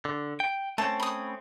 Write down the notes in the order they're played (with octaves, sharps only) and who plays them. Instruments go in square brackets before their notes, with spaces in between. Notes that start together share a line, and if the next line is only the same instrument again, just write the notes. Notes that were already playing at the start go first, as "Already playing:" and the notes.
[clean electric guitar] D3
G5
[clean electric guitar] A3 C4 C#4 [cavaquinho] A5
[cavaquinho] B5 D#6